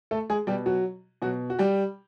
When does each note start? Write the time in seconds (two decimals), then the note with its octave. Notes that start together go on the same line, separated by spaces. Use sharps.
0.11 A3 A4
0.30 G#3 G#4
0.47 B2 G3 G4
0.66 F#3 F#4
1.22 B2 F#3 F#4
1.50 F#4
1.59 G3 G4